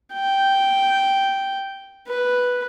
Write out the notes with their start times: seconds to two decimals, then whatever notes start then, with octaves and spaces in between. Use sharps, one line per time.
0.14 G5
2.08 B4